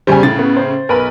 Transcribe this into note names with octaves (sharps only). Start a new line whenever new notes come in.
E2 C#3 G3 C5 G#5
A2 C#3 A6
B3
C5
B1 A#4 B4